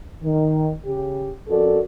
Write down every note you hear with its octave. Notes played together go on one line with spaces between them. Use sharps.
D#3
C#3 G4
F2 C#4 F#4 A4 A#4 D5